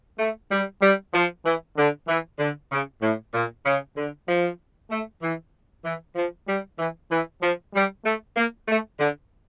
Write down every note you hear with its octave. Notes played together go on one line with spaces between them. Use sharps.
A3
G3
G3
F3
E3
D3
E3
D3
C#3
A2
A#2
C#3
D3
F3
A3
E3
E3
F3
G3
E3
E3
F3
G3
A3
A#3
A3
D3